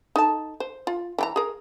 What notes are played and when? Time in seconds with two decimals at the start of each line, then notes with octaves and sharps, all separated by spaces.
0.16 D#4 A4 A5
0.60 C5
0.87 F4
1.18 E3 G5 A#5
1.36 G#4 A#4